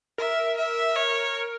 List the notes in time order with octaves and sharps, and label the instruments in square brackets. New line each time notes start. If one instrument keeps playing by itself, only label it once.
[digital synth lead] A#4 [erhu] E5
[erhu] E5
C#5